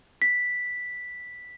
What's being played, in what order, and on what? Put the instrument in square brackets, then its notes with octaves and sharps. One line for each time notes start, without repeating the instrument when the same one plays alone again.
[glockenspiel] B6